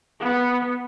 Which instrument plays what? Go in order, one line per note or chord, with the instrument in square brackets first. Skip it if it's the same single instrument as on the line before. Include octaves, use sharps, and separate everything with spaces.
[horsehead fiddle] B3